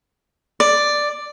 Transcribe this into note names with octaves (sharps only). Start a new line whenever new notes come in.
D5